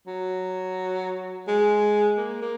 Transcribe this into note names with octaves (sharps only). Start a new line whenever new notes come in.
F#3
G#3
A#3
A#3